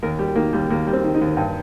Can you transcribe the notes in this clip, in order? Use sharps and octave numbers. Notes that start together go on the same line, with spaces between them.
D#2 A#4
G3 G4
D#3 A#3
D#2 G3
D#2 A#3
G3
C4
D#3
D#4
D#2
G2